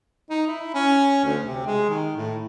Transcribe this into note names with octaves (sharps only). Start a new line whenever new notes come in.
D#4
E4
C#4
D2
C3
G#3
D#3
A2